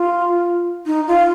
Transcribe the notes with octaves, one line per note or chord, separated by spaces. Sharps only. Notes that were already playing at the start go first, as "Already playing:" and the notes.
Already playing: F4
D#4
F4